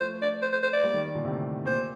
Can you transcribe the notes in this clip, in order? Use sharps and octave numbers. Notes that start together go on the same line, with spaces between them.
F3 A3 C5
D5
C5
C5
C5
D5
G3 A#3
D#3 G3
A#2 D3
A2 C3
A#2 C5